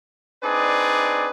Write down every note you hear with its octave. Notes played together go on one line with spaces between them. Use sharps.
C4 D4 D#4 G#4 B4 D5